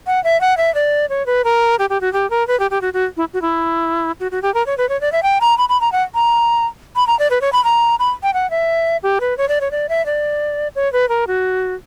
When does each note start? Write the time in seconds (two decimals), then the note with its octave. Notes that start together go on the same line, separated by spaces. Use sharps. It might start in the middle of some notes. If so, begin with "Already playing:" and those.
0.07 F#5
0.24 E5
0.41 F#5
0.57 E5
0.75 D5
1.10 C#5
1.26 B4
1.44 A#4
1.79 G4
1.90 G4
2.01 F#4
2.13 G4
2.30 A#4
2.48 B4
2.60 G4
2.71 G4
2.81 F#4
2.94 F#4
3.17 E4
3.34 F#4
3.42 E4
4.20 F#4
4.32 F#4
4.42 G4
4.54 A#4
4.66 C#5
4.78 B4
4.89 C#5
5.01 D5
5.12 E5
5.23 G5
5.41 A#5
5.58 B5
5.69 B5
5.81 A#5
5.92 F#5
6.15 A#5
6.96 B5
7.07 A#5
7.19 D5
7.31 B4
7.41 C#5
7.53 B5
7.64 A#5
7.99 B5
8.23 G5
8.34 F#5
8.50 E5
9.03 G4
9.21 B4
9.38 C#5
9.49 D5
9.61 C#5
9.71 D5
9.89 E5
10.06 D5
10.75 C#5
10.93 B4
11.09 A#4
11.27 F#4